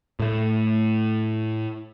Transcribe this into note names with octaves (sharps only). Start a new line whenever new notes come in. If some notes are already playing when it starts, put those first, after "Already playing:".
A2 A3